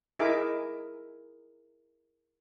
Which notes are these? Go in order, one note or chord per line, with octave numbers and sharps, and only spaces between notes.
D#4 E4 G#4 A#4 E5 D6